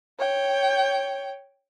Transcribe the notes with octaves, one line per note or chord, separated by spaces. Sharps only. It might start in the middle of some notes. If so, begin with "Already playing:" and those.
C#5 G5